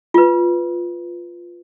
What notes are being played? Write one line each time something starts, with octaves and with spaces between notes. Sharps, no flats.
F4 B4